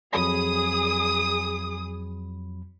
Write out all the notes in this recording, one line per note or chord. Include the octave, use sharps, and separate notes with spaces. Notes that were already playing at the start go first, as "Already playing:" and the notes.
F2 F#3 G#4 B5 D#6